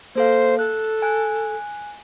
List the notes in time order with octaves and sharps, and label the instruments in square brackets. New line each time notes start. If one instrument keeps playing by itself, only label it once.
[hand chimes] A#3 A4 F5 [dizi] C5
[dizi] A4 [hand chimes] F#6
[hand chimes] G#5 F#6